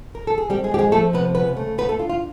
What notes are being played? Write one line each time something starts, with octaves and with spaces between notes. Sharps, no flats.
A#4
A4
G#4
G3 C4 G4
G#3 G#4
C4 G4
G#3 G#4
F3 A3 A4
C3 B3 B4
C#3 B3 B4
A3
A3 B3 B4
A3 A4
D4 F4
F4